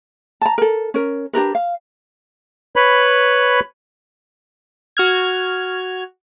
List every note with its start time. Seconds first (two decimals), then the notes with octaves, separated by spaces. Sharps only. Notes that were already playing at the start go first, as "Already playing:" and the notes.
0.41 A5 A#5
0.58 A4 A#4
0.94 C#4 A#4
1.33 D4 G4 A#4 B4
1.55 F5
2.76 B4 C#5 B5
4.97 F#4 F6 G#6